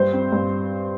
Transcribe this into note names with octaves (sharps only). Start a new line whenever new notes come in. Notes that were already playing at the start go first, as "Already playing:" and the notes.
Already playing: G2 C5
C4
G2